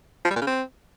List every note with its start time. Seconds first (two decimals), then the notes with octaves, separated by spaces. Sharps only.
0.25 F3
0.30 G3
0.36 A#2
0.41 C#3
0.47 C4